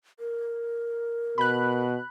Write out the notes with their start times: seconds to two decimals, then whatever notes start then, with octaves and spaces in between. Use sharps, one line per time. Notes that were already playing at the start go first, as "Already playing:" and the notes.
0.20 A#4
1.38 B2 B5 F#6